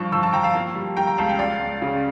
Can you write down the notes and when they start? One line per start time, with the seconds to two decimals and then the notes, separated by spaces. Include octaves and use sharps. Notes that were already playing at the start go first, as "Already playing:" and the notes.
Already playing: G2 F3 A5 C#6
0.12 F3 C#6 E6
0.23 A5 C#6
0.33 F3 G5 A#5
0.43 F5 A5
0.55 A#3
0.75 G3
0.97 G3 G5 A#5
1.07 A#5
1.18 C#2 F5 A5
1.29 G5
1.39 C#2 D5 F5
1.60 C#2
1.82 C#3